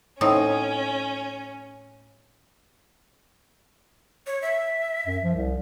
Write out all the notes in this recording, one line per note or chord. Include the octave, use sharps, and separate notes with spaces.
A2 C4 C#4 D#4
C#5
E5
F#2
F3
C2